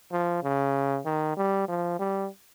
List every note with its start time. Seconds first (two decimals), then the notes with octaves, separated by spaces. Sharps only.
0.12 F3
0.43 C#3
1.05 D#3
1.37 G3
1.68 F3
1.99 G3